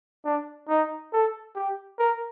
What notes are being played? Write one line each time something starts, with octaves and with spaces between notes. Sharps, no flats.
D4
D#4
A4
G4
A#4